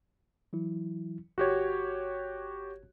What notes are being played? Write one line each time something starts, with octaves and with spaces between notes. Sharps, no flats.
E3 F#3 E4
G1 F#4 G4 C#5 G#6